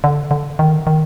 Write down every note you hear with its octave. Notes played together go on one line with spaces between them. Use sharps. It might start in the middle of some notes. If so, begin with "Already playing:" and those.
D3
D3
D#3
D#3